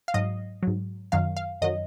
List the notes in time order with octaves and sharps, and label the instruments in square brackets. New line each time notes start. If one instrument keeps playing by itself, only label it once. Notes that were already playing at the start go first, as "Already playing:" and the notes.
[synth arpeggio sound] F5
G#2 F#3 D#5
G#2 F#3
F#2 D#3 F#3 F5
F5
F#2 D#3 F#3 D#5